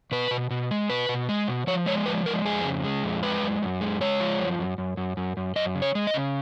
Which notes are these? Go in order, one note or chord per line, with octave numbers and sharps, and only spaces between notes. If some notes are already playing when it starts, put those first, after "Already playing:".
B2 B4
B2
B2
G#3
B2 B4
B2
G#3
B2
F3 C#5
G#3 C#5
F3 B4
G#3 A#4
F2 G#4
C#3
G#3
F2
G#3 B4
F#2
F#2
G#3
G#3 C#5
F3
F#2
F#2
F#2
F#2
F#2
F#2
F#2 D#5
C#3
C#5
G#3
D#5
C#3